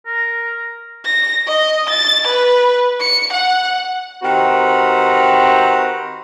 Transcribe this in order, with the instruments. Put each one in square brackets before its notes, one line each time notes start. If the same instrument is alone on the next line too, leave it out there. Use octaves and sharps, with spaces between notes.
[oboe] A#4
[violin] A#6
D#5
A6
B4
C#7
F#5
[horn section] D#3 C4 F#4 G4 B4 A#5